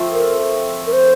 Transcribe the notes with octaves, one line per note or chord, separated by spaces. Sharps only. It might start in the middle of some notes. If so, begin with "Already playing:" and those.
Already playing: F3 A3 C4 F4
A#4
A#4
C5